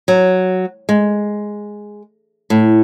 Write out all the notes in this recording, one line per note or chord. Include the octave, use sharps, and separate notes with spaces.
F#3
G#3
A2